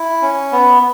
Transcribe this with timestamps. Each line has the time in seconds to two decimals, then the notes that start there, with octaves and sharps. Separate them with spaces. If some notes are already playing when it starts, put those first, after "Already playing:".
Already playing: E4
0.22 C#4
0.52 B3